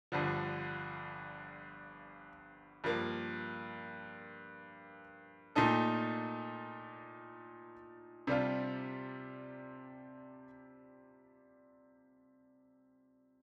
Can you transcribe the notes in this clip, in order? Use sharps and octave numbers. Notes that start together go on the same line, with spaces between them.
G1 G2 D3 F3
G2 F3 A#3
A#2 A3 D#4 A4
C3 G3 D4 F4